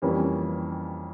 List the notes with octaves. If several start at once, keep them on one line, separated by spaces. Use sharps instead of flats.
F2 E3 G3 A#3 C#4